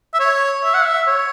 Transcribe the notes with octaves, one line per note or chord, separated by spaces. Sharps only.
E5
C#5
E5
F#5
E5
C#5